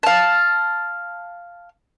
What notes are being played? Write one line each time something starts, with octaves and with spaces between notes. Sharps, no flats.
F5 A5